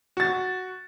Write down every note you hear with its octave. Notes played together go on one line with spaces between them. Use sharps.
F#4 A6